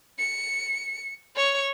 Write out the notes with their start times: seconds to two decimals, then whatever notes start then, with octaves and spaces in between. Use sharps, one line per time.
0.18 C#7
1.35 C#5 C#6